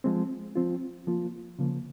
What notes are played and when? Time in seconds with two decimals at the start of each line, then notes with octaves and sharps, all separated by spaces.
0.04 F3 G#3 C4
0.56 F3 C4 F4
1.07 F3 A#3 F4
1.59 C#3 F3 A#3